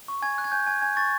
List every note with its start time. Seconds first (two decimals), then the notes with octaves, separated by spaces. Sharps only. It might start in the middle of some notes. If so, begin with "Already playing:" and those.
0.08 C#6
0.22 G#5 G#6
0.38 F#6
0.44 G#6
0.52 G#5 G6
0.67 G#5 G#6
0.82 G#5 G#6
0.97 C#6 A6